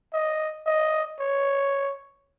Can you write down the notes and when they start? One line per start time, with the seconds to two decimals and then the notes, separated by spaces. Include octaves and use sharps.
0.14 D#5
0.66 D#5
1.20 C#5